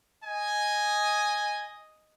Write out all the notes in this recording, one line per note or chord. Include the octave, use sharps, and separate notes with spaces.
D#5 G#5